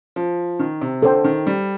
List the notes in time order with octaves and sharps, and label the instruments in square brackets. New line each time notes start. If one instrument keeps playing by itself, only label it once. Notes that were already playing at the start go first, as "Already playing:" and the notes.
[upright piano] F3
D#3
C3
[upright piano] D3 [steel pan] A4 C5 G5
[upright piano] D#3
G3